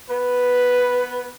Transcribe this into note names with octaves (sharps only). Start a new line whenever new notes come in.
B3 B4